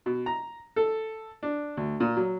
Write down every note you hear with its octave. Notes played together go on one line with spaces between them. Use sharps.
B2
A#5
A4
D4
D2
A#2
F#3